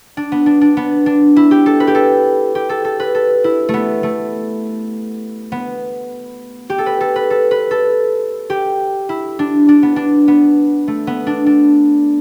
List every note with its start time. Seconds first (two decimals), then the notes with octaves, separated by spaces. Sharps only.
0.17 D4
0.32 B3
0.46 D4
0.61 D4
0.77 B3
1.06 D4
1.36 E4
1.51 G4
1.66 A4
1.80 B4
1.87 G4
1.95 A4
2.55 G4
2.69 A4
2.84 A4
3.00 B4
3.15 A4
3.44 E4
3.69 A3
3.74 B3
4.03 A3
5.52 B3
6.70 G4
6.78 A4
6.86 B4
7.01 A4
7.16 B4
7.30 A4
7.51 B4
7.71 A4
8.50 G4
9.09 E4
9.39 D4
9.69 D4
9.83 B3
9.96 D4
10.28 B3
10.88 A3
11.07 B3
11.27 D4
11.46 D4